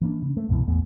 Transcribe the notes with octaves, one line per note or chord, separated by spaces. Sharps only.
E3 A#3 D4
C#3
A3
C2 F#2 B2 E3
A1 E2 A3 B3